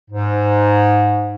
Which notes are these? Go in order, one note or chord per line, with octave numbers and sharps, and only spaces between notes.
G#2